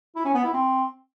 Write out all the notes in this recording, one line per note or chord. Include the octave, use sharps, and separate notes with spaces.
E4
C#4
B3
E4
C4